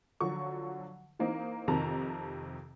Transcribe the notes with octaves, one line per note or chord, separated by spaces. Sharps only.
D3 F3 F#3 C#6
E3 A#3 C4 D#4
F2 C3 D#3 A5 A#5